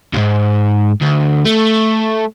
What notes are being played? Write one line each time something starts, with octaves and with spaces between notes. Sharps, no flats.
D#2 G#2
D2
A3